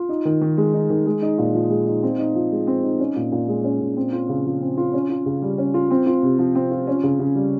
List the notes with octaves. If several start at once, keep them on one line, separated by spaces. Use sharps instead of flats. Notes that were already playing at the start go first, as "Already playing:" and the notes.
Already playing: F4
D#4
D#3
D#3
G#3
D#4
D#3
G#3
D#4
A#2
F3
G#3
D#4
C4
D#4
F3
G#3
C4
D#4
C#4
A#2
A#2
G#3
C#4
A#2
C4
F4
C#3
F3
C4
F4
C#4
F4
C#3
G3
C#4
F4
C4
F4
C3
F3
C4
F4
C#4
C#3
C#3
G3